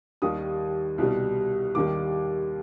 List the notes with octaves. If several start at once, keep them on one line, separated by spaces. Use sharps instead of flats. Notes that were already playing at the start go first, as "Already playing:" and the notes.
D#2 D#3 G3 D#6
C2 B2 G3
D#2 D#3 G3 D6